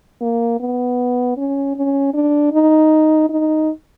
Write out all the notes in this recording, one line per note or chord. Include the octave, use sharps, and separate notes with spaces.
A#3
B3
C#4
C#4
D4
D#4
D#4